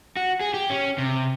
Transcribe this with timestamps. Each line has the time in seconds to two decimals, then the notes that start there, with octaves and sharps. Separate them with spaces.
0.17 F#4
0.41 G#4
0.54 G4
0.70 C#4
0.98 C3